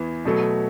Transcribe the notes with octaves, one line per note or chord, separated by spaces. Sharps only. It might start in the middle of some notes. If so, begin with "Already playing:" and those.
Already playing: E2 E3 B3
B2 F#3 A3